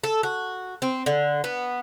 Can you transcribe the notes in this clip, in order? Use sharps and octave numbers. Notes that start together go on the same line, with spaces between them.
A4
F#4
C4
D3
B3